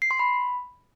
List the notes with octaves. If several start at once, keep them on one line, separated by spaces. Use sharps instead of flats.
C7
C6
B5